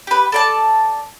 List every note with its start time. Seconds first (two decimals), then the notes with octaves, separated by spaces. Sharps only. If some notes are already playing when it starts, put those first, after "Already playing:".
0.07 G4 B4
0.32 A4 D5 A5